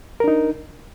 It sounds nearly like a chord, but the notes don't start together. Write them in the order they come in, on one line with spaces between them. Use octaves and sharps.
A#4 D4 D#4